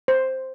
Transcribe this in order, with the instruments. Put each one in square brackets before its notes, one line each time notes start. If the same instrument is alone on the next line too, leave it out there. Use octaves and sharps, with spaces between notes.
[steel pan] C5